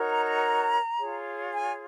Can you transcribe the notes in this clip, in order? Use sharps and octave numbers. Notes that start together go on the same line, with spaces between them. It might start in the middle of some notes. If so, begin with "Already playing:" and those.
Already playing: D#4 F#4 A#4 C#5
A#5
A#5
F4 G#4 C#5
G#5